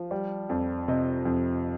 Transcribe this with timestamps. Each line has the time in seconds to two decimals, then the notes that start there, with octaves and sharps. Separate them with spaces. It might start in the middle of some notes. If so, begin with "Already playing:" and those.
Already playing: F3
0.11 G3
0.50 F2
0.88 C3 D#5
1.25 F2